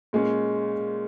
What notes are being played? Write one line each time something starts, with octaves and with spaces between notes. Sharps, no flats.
A#2 G#3 C#4